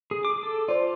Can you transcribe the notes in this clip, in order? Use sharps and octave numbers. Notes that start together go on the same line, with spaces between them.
G#4
D6
A4
F4 C5 D5